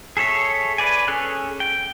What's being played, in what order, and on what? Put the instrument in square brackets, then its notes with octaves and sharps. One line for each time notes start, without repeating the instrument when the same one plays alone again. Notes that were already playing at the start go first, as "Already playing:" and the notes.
[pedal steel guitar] G#4 A4 C#5 E5
B4 D5 G#5
C#4 G#4 A4 G#5 F#6
G5